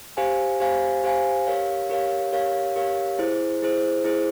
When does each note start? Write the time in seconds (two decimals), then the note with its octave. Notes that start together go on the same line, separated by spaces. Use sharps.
0.17 G4 C5 F5 G#5
0.60 G4 C5 F5 G#5
1.04 G4 C5 F5 G#5
1.47 G4 A#4 C#5 F5
1.90 G4 A#4 C#5 F5
2.32 G4 A#4 C#5 F5
2.76 G4 A#4 C#5 F5
3.19 E4 G#4 C5
3.62 E4 G#4 C5
4.05 E4 G#4 C5